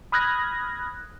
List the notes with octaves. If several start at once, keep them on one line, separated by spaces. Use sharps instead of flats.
B5 D#6 F6 F#6 G#6 A#6